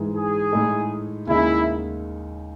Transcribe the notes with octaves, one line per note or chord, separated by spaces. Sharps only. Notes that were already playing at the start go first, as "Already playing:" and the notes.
Already playing: G#2 E3 G#3
G#4
A2 G#3 D#4 A4
D#2 C#3 G#3 D#4 E4